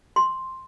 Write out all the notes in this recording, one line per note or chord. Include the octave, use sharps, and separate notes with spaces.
C6